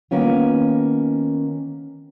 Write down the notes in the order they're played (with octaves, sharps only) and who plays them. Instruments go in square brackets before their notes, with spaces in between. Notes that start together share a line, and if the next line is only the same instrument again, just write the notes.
[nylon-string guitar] D#3 A#3 B3 C#4 F4